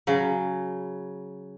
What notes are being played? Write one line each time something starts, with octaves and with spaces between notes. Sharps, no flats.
C#3 F#3